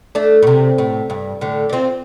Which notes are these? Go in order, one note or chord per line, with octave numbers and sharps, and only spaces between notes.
A3 D4
A2
C3
A2
G2
A2 D3
D4
C4 F4